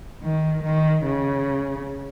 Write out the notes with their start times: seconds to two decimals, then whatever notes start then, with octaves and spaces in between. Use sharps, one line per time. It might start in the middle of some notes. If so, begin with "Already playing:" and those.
0.23 D#3
0.64 D#3
1.05 C#3